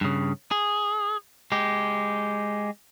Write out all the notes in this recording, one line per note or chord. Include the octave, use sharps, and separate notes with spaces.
G2 C#3
G#4
G#3 G4